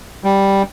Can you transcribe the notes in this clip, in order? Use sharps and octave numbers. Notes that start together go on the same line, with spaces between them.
G3